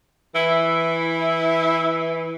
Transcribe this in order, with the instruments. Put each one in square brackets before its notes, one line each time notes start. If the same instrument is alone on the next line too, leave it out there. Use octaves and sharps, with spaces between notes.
[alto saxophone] E3 [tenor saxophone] E4